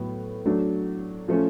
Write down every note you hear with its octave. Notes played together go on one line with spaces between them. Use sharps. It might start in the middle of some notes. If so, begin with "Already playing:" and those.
Already playing: A2 F#3 B3
F#3 A3 D4
F3 A3 C#4